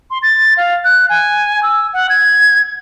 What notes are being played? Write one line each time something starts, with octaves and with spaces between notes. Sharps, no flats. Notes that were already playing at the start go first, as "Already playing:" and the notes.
C6
A6
F5
F#6
G#5
E6
F#5
G#6